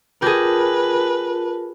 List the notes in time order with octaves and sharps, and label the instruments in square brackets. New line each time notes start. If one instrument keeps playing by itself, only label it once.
[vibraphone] F4 A#4 A5 [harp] G4 G#4 [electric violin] B4